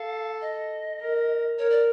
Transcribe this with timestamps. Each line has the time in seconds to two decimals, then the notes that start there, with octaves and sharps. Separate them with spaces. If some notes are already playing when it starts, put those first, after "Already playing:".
Already playing: A4 F5
0.41 D#5
1.00 A#4
1.59 A#4 C#5
1.70 D5